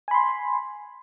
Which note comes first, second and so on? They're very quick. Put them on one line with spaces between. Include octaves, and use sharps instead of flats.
G#5 B5 C6